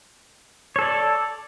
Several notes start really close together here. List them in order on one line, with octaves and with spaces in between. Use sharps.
C#5 A4 D5